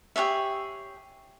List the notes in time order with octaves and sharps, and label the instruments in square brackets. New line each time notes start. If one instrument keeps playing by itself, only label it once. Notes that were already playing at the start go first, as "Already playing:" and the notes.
[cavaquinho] G4 G#4 C#5 E5